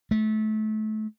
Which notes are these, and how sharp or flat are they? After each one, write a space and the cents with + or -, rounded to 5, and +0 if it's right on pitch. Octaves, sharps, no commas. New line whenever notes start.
A3 -25